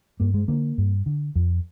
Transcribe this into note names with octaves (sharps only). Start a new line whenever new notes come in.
G2 A#3
G#3
D3 A#3
G2
D3
F2